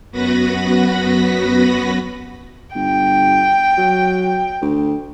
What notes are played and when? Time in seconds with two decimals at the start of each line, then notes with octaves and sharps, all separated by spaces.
0.12 F#2 B3 F#4 B4 B5 A#6
2.75 G1 G5
3.78 F#3
4.62 D2